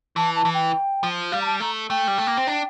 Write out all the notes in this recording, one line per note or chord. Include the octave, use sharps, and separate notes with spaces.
E3 A5
A5
E3
G5
F3
G3 F5
A#5
A5
A3 A#5
A3 G5
G3
A3
A#3
C4
D4